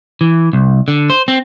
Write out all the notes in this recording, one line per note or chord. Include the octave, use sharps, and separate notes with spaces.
E3
C2
D3
C5
C4